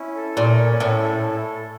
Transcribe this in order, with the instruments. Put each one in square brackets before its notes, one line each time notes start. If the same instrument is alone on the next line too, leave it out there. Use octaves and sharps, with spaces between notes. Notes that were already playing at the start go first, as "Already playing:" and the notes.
Already playing: [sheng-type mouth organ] C#4 E4
A4
[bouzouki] A#2 [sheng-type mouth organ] C#5
[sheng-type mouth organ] C#4
[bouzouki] A2 [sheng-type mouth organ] E4
[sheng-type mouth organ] A4